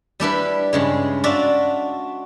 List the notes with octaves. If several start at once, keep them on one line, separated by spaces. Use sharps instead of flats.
G3 D4 E4 B4
G2 C#3 G#3
D4 F4 F#4 D5 E5